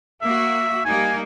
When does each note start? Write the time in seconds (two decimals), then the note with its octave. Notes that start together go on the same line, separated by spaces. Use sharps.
0.22 A#3 F#4 E5
0.85 G3 A#3 D#4 G#5